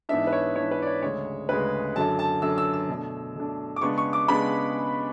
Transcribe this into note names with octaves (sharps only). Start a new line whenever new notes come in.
G#2 E3 B3 D4 E5
B4
C#5
G#2 E3 B3 D4 C#5
B4
D5
C#5
D2 C#3 G#3 C#5
D2 C#3 G#3 B4
F#2 D3 F#3 A5
A5
F#2 D3 F#3 E6
E6
E6
B2 A3 D4
B2 A3 D4
D6
C#3 G#3 B3 D4 C#6
C#6
D6
C#3 G#3 B3 D4 B5